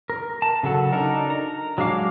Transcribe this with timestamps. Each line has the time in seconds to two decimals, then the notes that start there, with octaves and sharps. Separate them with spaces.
0.10 A#4
0.42 A5
0.63 C#3 F#3 A4 F#5
0.92 D4 D#4 A4 A#4
1.30 A#5
1.78 F#3 G#3 D4 F5 D6